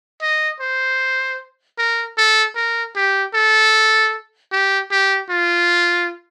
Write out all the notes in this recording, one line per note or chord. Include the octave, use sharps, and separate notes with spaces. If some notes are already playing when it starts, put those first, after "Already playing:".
D#5
C5
A#4
A4
A#4
G4
A4
G4
G4
F4